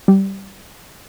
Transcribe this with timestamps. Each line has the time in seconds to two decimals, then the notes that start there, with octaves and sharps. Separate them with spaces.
0.08 G3